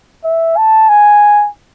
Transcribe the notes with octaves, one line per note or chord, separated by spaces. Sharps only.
E5
A5
G#5